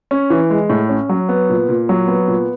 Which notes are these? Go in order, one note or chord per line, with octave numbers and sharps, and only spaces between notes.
C#4
E3
G#3
A2
C#4
F#3
B3
A#2
A#2
F#3
B3
A#2